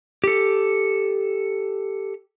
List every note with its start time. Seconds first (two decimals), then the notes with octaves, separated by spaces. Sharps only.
0.24 G4 A4